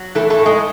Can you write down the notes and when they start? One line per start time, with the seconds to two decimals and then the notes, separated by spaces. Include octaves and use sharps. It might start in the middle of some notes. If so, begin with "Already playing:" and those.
Already playing: F#3
0.15 E3 A3 A4
0.30 A3 A4
0.38 A2
0.46 G#3 G#4